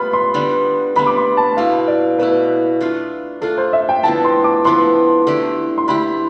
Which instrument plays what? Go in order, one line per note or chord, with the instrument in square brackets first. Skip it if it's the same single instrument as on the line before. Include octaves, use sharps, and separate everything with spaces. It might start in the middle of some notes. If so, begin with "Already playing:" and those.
Already playing: [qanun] G3 B3 F4 [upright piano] B5
[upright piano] C6
[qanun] D3 G3 B3
[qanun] D3 G3 B3 [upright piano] B5
[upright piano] D6
C6
A5
[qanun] B2 A3 E4 [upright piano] F5
[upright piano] D5
[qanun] B2 A3 E4 [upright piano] B4
[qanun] A3 D4 F4
[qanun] A3 D4 F4 [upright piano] A4
[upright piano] C5
E5
G5
[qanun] D3 F3 B3 E4 [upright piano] A5
[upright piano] C6
D6
[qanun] D3 F3 B3 E4 [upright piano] C6
[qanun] D3 A3 E4 G4
[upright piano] C6
[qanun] D3 A3 E4 G4 [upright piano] B5